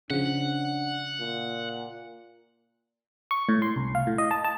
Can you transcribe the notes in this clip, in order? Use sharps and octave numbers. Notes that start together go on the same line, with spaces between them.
C#3 F3 D4 F#5
A#2
C#6
A2
C6
C2
F5
A2
D#5
A5
A5